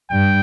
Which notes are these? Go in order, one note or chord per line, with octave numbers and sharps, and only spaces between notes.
G2 G5